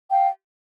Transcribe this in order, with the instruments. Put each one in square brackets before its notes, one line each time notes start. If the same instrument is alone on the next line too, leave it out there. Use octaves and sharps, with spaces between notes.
[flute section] F5 G5